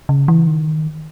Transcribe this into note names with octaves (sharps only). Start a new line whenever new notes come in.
C#3
E3
D#3